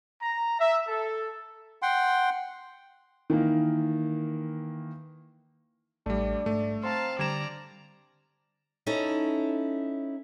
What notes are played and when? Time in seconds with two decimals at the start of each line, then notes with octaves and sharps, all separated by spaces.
0.21 A#5
0.58 E5
0.87 A4
1.82 F#5 G5 C6
3.30 D#3 E3 A#3
6.06 A1 G3 A3 D4
6.46 G#2 A3
6.83 C4 F5 A5 A#5 C6
7.19 D3 G3 D5 A#5 G#6 E7
8.87 C#4 D#4 E4 A4